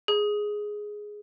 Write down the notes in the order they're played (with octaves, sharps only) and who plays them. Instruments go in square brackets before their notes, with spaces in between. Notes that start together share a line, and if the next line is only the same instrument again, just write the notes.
[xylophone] G#4